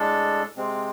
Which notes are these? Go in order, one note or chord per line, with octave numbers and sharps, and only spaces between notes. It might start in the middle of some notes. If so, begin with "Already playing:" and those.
Already playing: A2 G#3 D4 A4
C3 G#3 C4